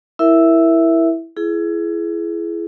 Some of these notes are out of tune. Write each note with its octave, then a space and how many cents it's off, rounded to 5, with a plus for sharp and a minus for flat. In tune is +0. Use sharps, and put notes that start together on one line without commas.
E4 +0 A#4 -5 E5 +0
E4 +30 G#4 +20